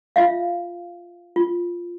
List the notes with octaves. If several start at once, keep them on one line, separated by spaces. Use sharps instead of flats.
F4 E5 F5
F4